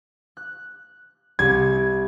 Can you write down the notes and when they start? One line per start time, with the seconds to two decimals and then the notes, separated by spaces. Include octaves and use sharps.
0.37 F#6
1.39 C2 G#6